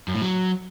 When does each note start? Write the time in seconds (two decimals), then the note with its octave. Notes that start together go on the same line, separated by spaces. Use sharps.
0.08 F#2
0.15 A2
0.22 F#3